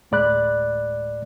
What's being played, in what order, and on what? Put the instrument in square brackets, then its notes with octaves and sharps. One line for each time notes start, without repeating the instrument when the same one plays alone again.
[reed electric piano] D2 A2 G#3 D5 B5 F#6